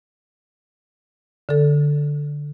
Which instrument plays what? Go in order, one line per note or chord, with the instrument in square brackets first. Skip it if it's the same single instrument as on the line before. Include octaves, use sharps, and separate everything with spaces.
[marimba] D3 A4